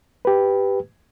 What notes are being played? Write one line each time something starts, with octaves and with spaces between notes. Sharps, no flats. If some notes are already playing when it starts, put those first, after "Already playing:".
G4 B4